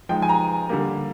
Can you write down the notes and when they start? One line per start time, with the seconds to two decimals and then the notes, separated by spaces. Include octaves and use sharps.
0.09 F3 G#3 D#4 G5
0.22 G#5
0.29 A#5
0.69 D3 G3 A#3